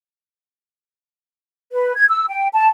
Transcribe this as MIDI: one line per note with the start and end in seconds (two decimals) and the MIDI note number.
1.72 1.92 71
1.96 2.04 92
2.08 2.24 88
2.29 2.47 79
2.53 2.67 81